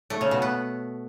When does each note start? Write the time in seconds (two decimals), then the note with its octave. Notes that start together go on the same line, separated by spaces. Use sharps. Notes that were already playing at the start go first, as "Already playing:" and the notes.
0.10 A3
0.21 C#3
0.31 B2
0.42 B3